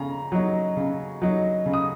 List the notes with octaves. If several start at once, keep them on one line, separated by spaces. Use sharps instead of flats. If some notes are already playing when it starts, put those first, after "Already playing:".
Already playing: C#3 A#5
F#3 D#4
C#3
F#3 D#4
C#3
D#6